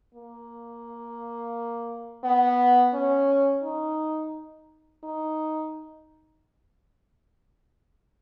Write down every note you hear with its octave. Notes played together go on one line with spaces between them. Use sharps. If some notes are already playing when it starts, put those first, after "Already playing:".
A#3
B3
C#4
D#4
D#4